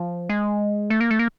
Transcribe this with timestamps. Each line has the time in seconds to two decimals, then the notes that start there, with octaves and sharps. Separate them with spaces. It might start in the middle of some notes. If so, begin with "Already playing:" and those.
Already playing: F3
0.29 G#3
0.90 A3
1.01 A#3
1.11 A3
1.19 A#3